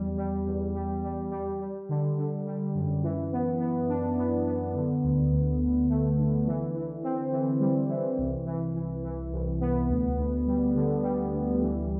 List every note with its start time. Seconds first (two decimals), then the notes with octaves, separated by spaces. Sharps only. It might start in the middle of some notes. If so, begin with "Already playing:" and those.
Already playing: E2 G3
0.18 G3
0.46 E2
0.75 G3
1.04 G3
1.31 G3
1.60 G3
1.89 D3
2.18 D3
2.46 G3
2.74 F#2
3.03 E3
3.32 B3
3.60 B3
3.88 D4
4.18 B3
4.46 B3
4.75 D3
5.03 D2
5.31 D2
5.61 D2
5.89 A3
6.17 D3
6.47 E3
6.74 E3
7.03 C4
7.32 E3
7.60 G3
7.89 E3
8.18 C2
8.46 E3
8.74 E3
9.04 E3
9.33 C2
9.61 B3
9.89 D2
10.18 D2
10.47 G3
10.75 D3
11.03 G3
11.32 D2
11.61 E3